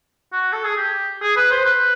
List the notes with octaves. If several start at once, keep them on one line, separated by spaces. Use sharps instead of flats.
F#4
A4
G#4
G4
G#4
B4
C5
B4